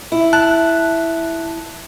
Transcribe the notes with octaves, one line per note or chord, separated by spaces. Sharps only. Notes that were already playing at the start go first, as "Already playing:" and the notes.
E4
A5 F#6